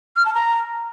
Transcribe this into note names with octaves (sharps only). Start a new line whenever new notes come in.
F6
A5
A#5